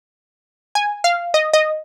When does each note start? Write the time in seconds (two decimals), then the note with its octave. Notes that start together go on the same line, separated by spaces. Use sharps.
0.75 G#5
1.04 F5
1.34 D#5
1.53 D#5